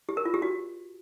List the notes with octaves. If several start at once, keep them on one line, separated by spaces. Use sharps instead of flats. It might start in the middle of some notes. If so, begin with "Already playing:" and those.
G4
A#4
F4
G4
F#4